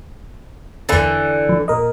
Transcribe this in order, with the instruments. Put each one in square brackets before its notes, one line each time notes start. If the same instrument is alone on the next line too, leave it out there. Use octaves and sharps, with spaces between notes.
[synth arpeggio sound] E2 A6 [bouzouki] D3 E3
[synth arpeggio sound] F3
[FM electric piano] A#2 A#4 D#5